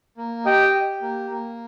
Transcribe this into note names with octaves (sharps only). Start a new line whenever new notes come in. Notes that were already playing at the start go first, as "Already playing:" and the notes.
A#3
G4 D#5 G5
G4
A#3
A#3